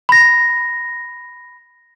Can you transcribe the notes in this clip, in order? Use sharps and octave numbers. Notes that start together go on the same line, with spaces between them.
B5 A#6